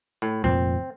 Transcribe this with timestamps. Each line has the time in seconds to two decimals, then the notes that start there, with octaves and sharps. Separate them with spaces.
0.22 A2
0.44 F1 F2 A#2 C4